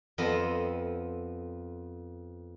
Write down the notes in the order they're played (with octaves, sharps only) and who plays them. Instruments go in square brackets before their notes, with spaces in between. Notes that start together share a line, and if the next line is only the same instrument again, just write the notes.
[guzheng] F2 B3 C4 D#5